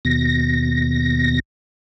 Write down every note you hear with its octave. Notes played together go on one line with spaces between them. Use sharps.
D#2 B2 A#6